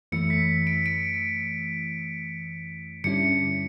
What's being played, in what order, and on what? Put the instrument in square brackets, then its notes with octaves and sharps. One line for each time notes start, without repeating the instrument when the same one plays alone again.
[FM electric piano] F#2 E3 A3 E4 [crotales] C#7
[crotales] B6
D7
D7
[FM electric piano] G2 D3 G3 C#4 E4 [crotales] C#7